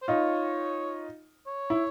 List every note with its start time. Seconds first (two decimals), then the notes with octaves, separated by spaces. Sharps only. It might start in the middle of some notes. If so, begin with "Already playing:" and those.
0.02 C5
0.08 D#4 F4 C#5
1.46 C#5
1.70 E4